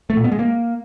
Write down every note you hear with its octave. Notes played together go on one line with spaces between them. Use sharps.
A3
A#2
B3
G#3
A#3